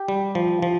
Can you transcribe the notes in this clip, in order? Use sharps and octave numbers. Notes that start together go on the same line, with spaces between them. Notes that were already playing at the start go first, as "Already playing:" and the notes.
Already playing: G4
G3
F3
F3